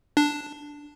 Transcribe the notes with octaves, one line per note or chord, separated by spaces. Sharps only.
D4